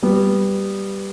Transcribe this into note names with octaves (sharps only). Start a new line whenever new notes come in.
G3 B3